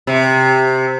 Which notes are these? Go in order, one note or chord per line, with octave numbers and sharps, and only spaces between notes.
C3